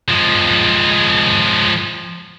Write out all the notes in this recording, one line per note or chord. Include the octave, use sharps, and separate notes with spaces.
F3 G#3